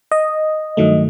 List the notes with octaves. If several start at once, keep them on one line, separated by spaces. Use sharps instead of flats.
D#5
G2 D#3 F#3 A3